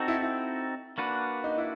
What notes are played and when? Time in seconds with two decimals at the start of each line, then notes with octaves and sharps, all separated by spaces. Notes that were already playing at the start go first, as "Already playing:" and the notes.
Already playing: C4 D#4 F#4 A4
0.08 E4
0.23 E4
0.98 A#3 D4 F#4 B4
1.44 D#4
1.58 E4